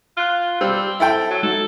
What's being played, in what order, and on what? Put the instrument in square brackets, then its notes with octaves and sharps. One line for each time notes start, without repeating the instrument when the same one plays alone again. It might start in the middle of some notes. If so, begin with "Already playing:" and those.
[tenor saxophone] F4 [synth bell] F6 F#6
[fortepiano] G3 [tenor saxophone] C4 [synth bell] E6
[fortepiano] E4 A4 G5
[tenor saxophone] F#3
[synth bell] G#3 D#4 F#4 [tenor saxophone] A4